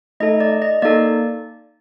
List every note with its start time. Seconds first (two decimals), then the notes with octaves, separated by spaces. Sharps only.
0.20 A3 D#4 A4 D#5
0.40 D5
0.62 D#5
0.82 A#3 D#4 A4 D5